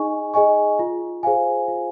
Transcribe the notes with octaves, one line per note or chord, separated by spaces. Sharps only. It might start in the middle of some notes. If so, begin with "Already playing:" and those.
Already playing: D#4 G#4 D#5 G#5 C#6
G#4 D#5 G#5 C#6
F4
G#4 C5 F5 G#5
F4